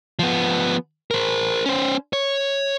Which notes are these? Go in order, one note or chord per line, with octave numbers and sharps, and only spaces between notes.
F3 B3
A#4 C5
C#4 C5
C#5